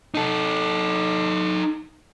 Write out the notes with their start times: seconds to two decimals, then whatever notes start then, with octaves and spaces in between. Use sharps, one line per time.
0.15 D#4 A4